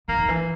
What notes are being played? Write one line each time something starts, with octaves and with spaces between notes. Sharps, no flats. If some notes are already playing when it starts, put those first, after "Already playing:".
D#3 A#3
D#3
E3